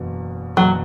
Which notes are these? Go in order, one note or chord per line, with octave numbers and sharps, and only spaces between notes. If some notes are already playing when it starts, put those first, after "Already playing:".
Already playing: F#1 E2 B2
F#1 E2 B2 F#3